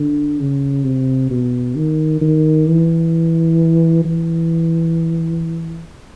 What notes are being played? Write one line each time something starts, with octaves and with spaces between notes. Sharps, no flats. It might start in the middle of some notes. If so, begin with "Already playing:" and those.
Already playing: D3
C#3
C3
B2
D#3
D#3
E3
E3